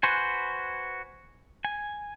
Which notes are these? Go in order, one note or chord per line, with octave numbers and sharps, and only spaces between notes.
F#4 B4 C5 G#5
G#5